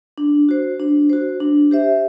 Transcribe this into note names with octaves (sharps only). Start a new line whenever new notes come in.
D4
F#4 C5
D4
F#4 C5
D4
G4 C5 E5